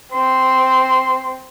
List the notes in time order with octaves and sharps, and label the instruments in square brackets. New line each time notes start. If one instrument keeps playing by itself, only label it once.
[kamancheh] C4 [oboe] C6